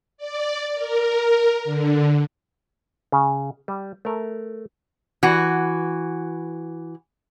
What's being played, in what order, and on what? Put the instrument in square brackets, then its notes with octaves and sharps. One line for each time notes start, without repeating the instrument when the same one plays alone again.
[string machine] D5
A#4
D3
[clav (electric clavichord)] C#3
G3
A3 A#4
[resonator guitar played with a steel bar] E3 F#4